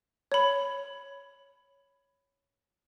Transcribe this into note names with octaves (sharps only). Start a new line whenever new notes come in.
C#5 B5